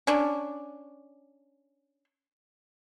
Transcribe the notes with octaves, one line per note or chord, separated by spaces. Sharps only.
C#4 D4